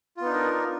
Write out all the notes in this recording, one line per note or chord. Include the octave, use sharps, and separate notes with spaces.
B3 D4 D#4 F4 A#4